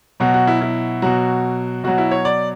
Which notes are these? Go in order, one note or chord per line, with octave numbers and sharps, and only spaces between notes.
B2 F#3 F#4
F#4
E4
E4
B2 F#3 F#4
B2 F#3 F#4
E4
C#5
D5